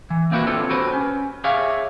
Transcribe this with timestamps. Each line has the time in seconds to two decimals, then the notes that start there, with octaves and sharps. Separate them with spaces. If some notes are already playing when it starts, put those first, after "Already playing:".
0.10 E3
0.31 A#3 C4 D#4 E4 F#4 B4
0.47 C4 D4 F4 A4 C#5
0.69 F#4 G4 B4 C5
0.93 C#4
1.44 G4 G#4 C#5 E5 F5